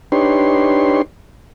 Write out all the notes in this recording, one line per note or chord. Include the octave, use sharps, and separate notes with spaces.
D4 D#4 G4 B4 C#5 C6